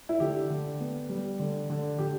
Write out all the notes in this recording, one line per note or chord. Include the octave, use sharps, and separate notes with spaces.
E4
D3 G4
D3
B3
G3
D3
D3
D3 G4